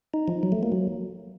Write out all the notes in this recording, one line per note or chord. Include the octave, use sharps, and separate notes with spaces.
D#4
F3
F#3
A3
A#3
F#3